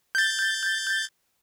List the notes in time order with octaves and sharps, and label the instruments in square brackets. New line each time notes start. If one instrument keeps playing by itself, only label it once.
[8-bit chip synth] G6 A6